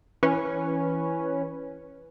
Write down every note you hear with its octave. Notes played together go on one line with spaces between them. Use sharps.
E3 C#4 B4